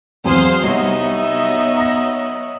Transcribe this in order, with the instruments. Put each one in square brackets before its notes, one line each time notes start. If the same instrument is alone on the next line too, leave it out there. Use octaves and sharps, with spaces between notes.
[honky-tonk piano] E2 F#3 C4 [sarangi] G#4 [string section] C5 F5 C6
[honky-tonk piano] C2 [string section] F#3 B3 [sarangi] D#4 [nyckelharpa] D#5 E5
[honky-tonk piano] A#5 A#6